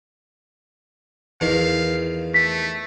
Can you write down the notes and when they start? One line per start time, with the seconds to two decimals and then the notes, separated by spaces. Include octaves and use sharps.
1.41 E2 D#3 E3 F5
2.34 A3 B6